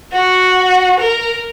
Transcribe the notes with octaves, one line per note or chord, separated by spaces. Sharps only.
F#4
A#4